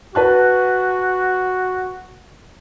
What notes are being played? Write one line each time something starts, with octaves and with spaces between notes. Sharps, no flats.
F#4 B4 A5 F#6